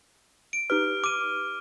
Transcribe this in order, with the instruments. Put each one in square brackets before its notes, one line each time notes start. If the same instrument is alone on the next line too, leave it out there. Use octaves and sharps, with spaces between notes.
[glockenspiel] D7
[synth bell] D#4 G4 B4 [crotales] F6
[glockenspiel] D6 D#7